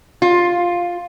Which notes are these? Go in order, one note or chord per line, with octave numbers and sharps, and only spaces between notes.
F4